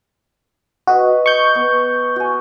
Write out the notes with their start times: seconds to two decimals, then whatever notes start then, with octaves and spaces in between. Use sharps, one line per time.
0.87 F#4 B4 D#5
1.26 C#6 G6
1.55 B3
2.16 F#4 G#5